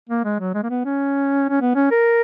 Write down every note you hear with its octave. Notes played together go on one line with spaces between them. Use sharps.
A#3
G#3
F#3
G#3
A#3
B3
C#4
C#4
B3
C#4
A#4